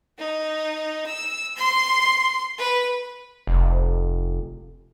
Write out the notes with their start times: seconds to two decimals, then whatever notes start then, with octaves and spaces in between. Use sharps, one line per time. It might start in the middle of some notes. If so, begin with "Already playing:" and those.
0.18 D#4
1.07 E6
1.57 C6
2.58 B4
3.47 F1